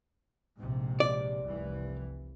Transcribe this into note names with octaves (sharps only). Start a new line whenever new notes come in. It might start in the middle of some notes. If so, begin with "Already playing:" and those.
A#1 G#2 C3
D5
F1 C2 E3